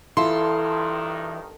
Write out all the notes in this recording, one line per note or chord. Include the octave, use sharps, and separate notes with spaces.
G2 D#3 E3 E4 F4 A4 C6